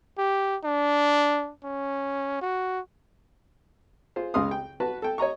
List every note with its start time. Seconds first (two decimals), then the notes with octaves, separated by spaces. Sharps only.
0.18 G4
0.64 D4
1.63 C#4
2.41 F#4
4.16 F4 G#4 C5
4.34 C#2 C#3 G#3 F5 C6 D#6
4.51 G5
4.80 F#4 B4 A5
5.02 A4 G5
5.18 C#5 D#5 A#5 C#6